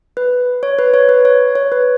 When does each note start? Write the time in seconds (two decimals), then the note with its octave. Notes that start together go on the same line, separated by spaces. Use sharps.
0.17 B4
0.63 C#5
0.79 B4
0.94 C#5
1.09 B4
1.25 C#5
1.55 C#5
1.72 B4